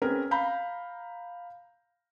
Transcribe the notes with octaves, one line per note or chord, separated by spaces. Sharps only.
C4 C#4 G#4 A#4 B4
F5 A#5 B5 G6